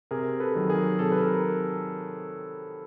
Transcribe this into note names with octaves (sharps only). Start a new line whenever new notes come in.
C3 G#4 A#4
A4 B4
D#3 F#3
G#4 A#4
C3 G4 A4
B4
G#4 A#4
A#4